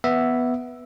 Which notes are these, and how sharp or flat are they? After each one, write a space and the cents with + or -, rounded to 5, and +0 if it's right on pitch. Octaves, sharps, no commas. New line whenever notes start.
B3 +0 E5 +0